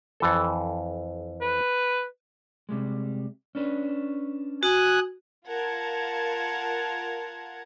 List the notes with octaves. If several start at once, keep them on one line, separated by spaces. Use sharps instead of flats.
F2 E3 A4
B4
C3 G3 G#3
C#4 D4 B4
F#4 G#5 D#6 F#6
F4 A#4 F#5 A5 G#6